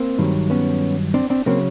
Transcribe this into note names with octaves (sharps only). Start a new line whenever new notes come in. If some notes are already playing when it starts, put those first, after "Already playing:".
Already playing: A#3 C4
G2 D#3 F#3
B3 C#4
C4 D4
C4 D4
C#3 F#3 A#3 C4